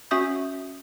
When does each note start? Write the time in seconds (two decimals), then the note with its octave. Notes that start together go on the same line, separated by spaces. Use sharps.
0.11 C#4 F#4 E5 D#6 G6